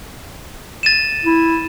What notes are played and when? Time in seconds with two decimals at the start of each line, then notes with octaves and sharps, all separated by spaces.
0.83 A6 D#7 E7
1.25 E4